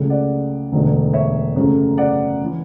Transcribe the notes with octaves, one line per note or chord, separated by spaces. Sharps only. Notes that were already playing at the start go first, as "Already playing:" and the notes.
Already playing: C#2 C#3 F#3 A3
D5 F#5
E1 D2 D3 F#3 A3
C#5 E5
F#2 C#3 F#3 A3
D5 F#5
E3